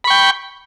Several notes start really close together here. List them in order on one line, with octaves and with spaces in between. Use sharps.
B5 C#6 G5